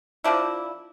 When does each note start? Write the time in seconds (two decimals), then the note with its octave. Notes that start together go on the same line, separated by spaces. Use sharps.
0.24 F3 A#3 D4 E4